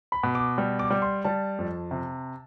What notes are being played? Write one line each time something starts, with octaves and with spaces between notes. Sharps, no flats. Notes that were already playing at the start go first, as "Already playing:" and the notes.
B5
B2
D6
G3
D6
G3
C6
G3 A5
F2
C3